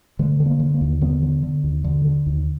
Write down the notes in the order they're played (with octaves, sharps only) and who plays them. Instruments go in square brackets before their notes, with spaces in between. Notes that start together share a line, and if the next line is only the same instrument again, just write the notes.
[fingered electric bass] D3 A3
D3
A#3
D3
A#3
D#2
D3 B3
D3
D3
D#2
D3
D3
D#2